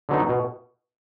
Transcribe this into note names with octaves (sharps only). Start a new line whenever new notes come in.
D3 F#3 B3 D#4
B2